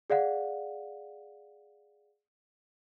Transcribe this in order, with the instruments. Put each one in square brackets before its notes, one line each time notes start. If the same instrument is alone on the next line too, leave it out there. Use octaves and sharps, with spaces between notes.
[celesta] G#4 D5 F5 F#5